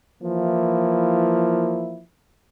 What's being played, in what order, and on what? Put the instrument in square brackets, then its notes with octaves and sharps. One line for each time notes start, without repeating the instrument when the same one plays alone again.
[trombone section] E3 F3 A#3 E4